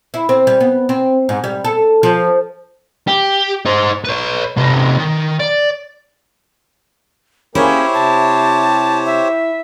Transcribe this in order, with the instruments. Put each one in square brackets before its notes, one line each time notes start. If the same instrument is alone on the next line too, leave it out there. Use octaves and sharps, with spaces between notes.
[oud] E4
C4
G3
B3
C4
G#2
G3
A4
F3
[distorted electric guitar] G4
D#4 C5
B4 C#5
C3 D#4
D#3
D5
[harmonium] A#3 G#4 A#4 [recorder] C#4 [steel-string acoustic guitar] E4 [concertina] G4 C5 C#5
[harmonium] C3 [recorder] A5
[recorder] E5